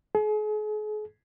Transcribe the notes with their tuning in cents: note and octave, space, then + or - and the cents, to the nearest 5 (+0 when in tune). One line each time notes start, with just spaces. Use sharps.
G#4 +40